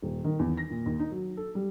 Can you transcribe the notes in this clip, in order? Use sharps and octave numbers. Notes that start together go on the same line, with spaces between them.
D#1
D#3
E2
A#6
A#2
D#2
D#4
F#3
A4
G3